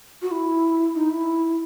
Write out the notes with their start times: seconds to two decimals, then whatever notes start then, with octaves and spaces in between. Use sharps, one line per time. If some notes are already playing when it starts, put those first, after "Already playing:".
0.22 F#4
0.31 E4
0.95 D#4
1.10 E4